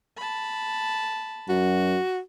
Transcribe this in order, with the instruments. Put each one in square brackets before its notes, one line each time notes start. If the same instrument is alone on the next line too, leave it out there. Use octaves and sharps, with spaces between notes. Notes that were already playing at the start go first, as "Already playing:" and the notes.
[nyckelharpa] A5 B5
[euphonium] F#2 [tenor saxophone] F#4